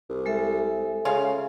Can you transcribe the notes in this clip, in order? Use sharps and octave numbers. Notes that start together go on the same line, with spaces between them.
C2
G#3 A4 E5
C#3 C#4 F4 F5